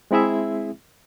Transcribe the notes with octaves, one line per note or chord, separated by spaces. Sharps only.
G#3 C4 E4 G#4 E5